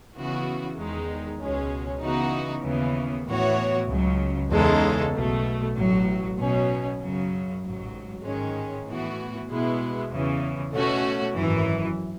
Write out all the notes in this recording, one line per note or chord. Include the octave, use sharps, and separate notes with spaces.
C#3 E3 B3 F#4
E2 D#3 G#3 D#4
C#2 B2 G#3 C#4
C#3 E3 B3 D#4 F#4
D#2 C#3 E3 B3
A2 E3 B3 F#4 C#5
C#2 C#3 F#3
E2 C#3 G#3 D#4 A4
B1 B2 A3
A1 A2 F#3
B1 B2 F#3 C#4
F#2 C#3 F#3
A1 G#2 F#3
G#2 D#3 G#3 C#4
A2 E3 B3 F#4
B2 G#3 B3 E4
E2 C#3 E3
B2 A3 C#4 F#4
G#1 F#2 E3